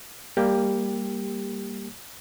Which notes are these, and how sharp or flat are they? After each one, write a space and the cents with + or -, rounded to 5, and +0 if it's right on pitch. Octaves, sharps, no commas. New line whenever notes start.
G3 +15 A#3 +0 G4 +10